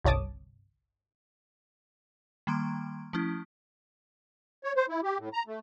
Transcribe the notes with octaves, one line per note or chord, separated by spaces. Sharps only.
G1 C2 C#5 A5 D6 D#6
D#3 G3 A#3 A#5 C6 D7
F3 A3 C#4 E4
C#5
C5
E4
G4
A2
A#5
A3